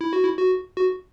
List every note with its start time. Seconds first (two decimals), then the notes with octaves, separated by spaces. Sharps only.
0.01 E4
0.13 F#4
0.23 E4
0.39 F#4
0.77 F#4